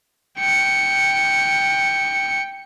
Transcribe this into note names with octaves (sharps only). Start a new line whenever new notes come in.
G5 C#7